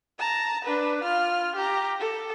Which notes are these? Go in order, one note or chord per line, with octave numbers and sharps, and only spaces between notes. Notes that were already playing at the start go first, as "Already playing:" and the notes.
A5 A#5
D4 B4
F4 F6
G4 A#5
A4